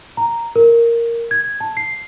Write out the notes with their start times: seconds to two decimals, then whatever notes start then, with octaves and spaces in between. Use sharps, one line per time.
0.17 A#5
0.56 A#4
1.31 G#6
1.60 A5
1.77 C7